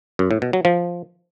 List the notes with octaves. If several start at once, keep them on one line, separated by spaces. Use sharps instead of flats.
F#2
A2
B2
F#3
F3